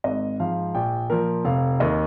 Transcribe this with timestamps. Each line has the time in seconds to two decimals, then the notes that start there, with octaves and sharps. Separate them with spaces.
0.04 G#1 D#5
0.40 G#2 F3 F5
0.75 A#1 G5
1.10 A#2 F3 A#4
1.45 F1 F5
1.80 D#2 D#3 D#5